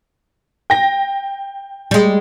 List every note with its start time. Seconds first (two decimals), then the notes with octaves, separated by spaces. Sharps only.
0.70 G5 A#6
1.91 G3 G#3